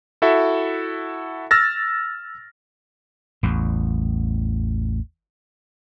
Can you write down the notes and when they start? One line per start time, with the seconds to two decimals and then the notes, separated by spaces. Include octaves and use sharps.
0.22 E4 F#4 A4 E5
1.51 E6 F6 A6 A#6
3.43 A1 E2